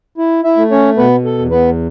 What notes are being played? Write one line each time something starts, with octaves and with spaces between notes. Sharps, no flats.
E4
E4 E5
A3
C#4 C#5
B2 B3 B4
A4
E2
B3 B4